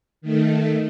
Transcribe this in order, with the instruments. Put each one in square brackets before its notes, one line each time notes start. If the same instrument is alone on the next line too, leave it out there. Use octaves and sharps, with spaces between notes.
[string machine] D#3 A3